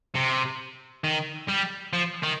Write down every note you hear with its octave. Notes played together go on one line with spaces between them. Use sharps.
C3
D#3
G3
F3
D#3